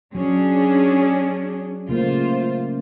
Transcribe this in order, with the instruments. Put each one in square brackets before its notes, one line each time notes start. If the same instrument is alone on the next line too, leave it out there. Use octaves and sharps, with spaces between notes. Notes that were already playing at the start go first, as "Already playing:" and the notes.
[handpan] F#3 [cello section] C#4 D4 G#4
[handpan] C#3 A3 A#3 [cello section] F4 C5